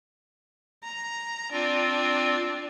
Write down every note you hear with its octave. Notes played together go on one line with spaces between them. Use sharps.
A#5
C4 D4 F4